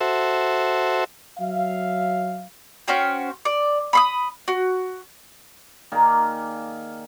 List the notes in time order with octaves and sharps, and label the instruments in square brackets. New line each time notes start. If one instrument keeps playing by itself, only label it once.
[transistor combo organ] F#4 A4 C5 E5
[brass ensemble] F#3 E5 F5
[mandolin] C#4 F#4 C5 G5
D5
B5 C6 D#6
F#4
[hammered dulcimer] D#3 A#3 G#4 D5